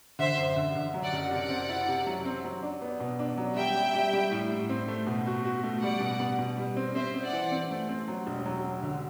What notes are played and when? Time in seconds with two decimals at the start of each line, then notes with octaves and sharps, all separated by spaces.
0.19 D3 C5 E5
0.38 F#2
0.56 D3
0.75 D3
0.94 F#3
1.03 D5 F#5
1.13 F#1
1.31 C3 D5 F#5
1.50 C4
1.69 E4
1.88 C3
2.06 F#3
2.25 C4
2.44 F#3
2.63 D4
2.82 B3
3.00 B2
3.19 D4
3.38 F#3
3.56 G3 E5 G5
3.76 G3
3.95 G3
4.13 G3
4.32 A2
4.51 A2
4.70 C4
4.88 A3
5.07 B2
5.26 F#4
5.45 F#4
5.63 A3
5.82 G3 D5 F#5
6.01 B2
6.20 B2
6.39 B2
6.58 G3
6.77 C4
6.95 C4 C5 E5
7.14 C4
7.23 D5 F#5
7.33 E3
7.52 C4
7.70 A3
7.89 C4
8.08 F#3
8.27 E1
8.46 F#3
8.64 F#3
8.83 D3